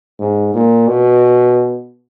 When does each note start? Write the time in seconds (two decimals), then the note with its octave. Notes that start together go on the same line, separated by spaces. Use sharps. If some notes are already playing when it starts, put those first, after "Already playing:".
0.20 G#2
0.54 A#2
0.87 B2